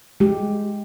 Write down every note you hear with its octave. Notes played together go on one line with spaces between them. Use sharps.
G#3 G4